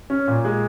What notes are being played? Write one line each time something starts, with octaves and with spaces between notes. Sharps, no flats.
C#4
A#2
G#3